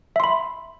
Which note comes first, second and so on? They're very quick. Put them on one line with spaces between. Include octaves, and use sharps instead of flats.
E5 C6 B5